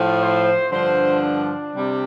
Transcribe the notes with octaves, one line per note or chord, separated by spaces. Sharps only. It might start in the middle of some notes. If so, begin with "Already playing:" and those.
Already playing: A2 F3
C5
G2 D3 F3 C5
D4
C3 G3